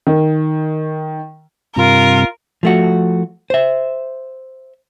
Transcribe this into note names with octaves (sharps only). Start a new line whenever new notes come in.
D#3
G2 C3 F4 A#4
F3 A3 F#4
C5 E5